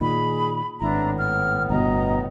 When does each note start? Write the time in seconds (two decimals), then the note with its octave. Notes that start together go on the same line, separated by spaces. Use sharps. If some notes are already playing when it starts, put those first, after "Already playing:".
0.01 A#2 D#3 G#4 B5
0.82 G#1 A2 B3 D4 E4 A#5
1.19 F6
1.70 G1 B2 D#5 A#5